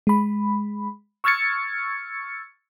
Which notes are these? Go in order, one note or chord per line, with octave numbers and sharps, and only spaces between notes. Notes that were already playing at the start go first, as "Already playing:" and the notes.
G#3 B5
C#6 E6 F6 G#6 A6 C#7